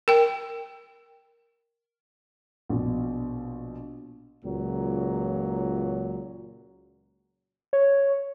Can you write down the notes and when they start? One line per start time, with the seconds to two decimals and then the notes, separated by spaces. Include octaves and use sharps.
0.08 A#4 G5
2.69 A#1 B2
4.45 C#2 A#2 F#3
7.73 C#5